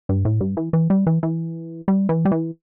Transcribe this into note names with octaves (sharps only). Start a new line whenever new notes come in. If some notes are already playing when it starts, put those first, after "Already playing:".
G2
A2
G2
E3
E3
G3
E3
E3
G3
E3
G3
E3